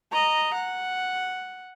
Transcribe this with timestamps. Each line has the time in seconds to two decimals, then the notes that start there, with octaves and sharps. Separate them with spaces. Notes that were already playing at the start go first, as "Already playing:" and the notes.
0.12 D#5 A#5
0.54 F#5